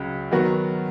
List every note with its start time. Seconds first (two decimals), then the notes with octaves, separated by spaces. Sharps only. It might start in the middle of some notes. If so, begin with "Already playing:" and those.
Already playing: C#2 C#3 F#3
0.31 D#3 F#3 B3 F#4 A#4